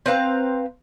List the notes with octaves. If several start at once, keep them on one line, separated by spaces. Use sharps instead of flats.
C4 B4 F5 A#5